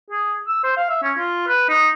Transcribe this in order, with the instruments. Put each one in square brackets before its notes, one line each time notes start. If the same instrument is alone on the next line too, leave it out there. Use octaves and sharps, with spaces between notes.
[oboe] G#4
E6
C5
F5
E5
C#4
F4
B4
D#4